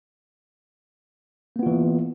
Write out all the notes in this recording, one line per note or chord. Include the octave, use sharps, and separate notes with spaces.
E3 A#3 B3 F4